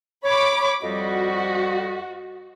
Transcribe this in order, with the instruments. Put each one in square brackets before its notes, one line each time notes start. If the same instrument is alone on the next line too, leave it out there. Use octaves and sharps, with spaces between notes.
[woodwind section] C#5 [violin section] B5 D6
[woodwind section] F2 G3 D#5 [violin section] F#4